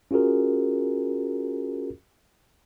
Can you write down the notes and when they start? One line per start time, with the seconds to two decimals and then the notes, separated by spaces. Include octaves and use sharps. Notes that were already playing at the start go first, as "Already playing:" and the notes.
0.11 C#4 F4 F#4 G#4 A#4